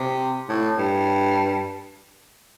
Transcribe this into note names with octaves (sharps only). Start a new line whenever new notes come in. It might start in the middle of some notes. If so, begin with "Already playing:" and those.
Already playing: C3
A2
G2